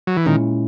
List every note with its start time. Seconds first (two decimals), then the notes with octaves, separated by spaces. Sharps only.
0.07 F#3
0.17 E3
0.25 A#2 D#3 G#3 C#4 E4